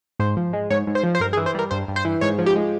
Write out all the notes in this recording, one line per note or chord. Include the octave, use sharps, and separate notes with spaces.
G#2 C5
F3
G#3
G#2 C#5
G#2
C5
F3
C5
G2 A#4
G#4
E3
C5
G3 A#4
G2 C5
G2
C5
E3
G#2 C#5
F3
G4
G#3